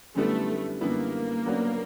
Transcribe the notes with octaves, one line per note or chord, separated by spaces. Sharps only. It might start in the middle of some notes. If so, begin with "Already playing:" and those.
F#2 D3 G3 A3 B3 E4
F#2 D3 G3 A#3 B3 E4
C#3 F#3 B3 D4 F#4